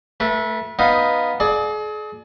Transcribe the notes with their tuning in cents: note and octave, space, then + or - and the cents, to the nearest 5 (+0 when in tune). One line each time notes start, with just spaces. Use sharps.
A3 +0 B4 -35
B3 +0 D#4 +0 F5 +0
G#4 +40 D5 +30